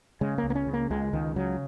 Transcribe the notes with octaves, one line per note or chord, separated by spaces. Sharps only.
C#3 G#3
A#3
C#2
A#3
C#4
C#3
A#3
C#2 G#3
C#2 D#3
C#3 F#3